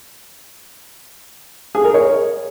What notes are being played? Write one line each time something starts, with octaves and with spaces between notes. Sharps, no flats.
G#4
A#4
C#5